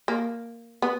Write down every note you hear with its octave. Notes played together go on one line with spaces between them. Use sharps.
A#3
B3